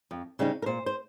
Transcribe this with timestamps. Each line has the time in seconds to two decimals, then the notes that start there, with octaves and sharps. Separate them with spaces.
0.11 F2
0.39 C#3 G3 C4 D#4
0.62 A#4
0.66 A#2 C5
0.86 C5